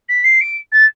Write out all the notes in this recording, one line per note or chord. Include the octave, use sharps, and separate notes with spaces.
B6
C7
D7
A6